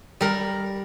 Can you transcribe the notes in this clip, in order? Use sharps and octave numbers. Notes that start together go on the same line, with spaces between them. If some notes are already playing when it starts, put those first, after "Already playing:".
G3 A#4